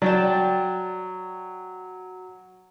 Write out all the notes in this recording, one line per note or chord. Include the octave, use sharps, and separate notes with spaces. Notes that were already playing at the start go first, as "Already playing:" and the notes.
F#3 D5 G5 A5